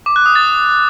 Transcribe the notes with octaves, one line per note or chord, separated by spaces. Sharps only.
D6
F#6
D#6
A6